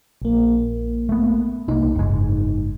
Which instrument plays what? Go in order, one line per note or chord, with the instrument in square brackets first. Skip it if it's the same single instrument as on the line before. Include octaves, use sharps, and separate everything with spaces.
[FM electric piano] A#1 A#3
[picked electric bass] A3 B3
[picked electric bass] C2 A#3 [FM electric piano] D#4
[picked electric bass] F#1 G#2